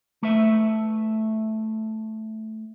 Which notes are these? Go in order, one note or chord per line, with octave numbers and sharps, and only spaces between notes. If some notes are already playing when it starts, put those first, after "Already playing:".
A3 B4 E5